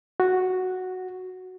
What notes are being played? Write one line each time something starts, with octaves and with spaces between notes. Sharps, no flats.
F#4